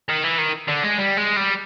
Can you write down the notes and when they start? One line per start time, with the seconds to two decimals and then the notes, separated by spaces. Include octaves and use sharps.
0.09 D#3
0.24 E3
0.38 D#3
0.68 D3
0.83 G#3
0.98 G3
1.17 G#3
1.36 G3